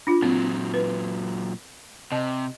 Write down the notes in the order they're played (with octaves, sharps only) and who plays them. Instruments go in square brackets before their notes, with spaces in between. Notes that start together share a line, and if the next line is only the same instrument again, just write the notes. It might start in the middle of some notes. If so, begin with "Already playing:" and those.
[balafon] D4 F4
[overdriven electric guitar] A#2 F#3 [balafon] C4
[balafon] B4
[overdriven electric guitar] C3 [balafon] D#5 A5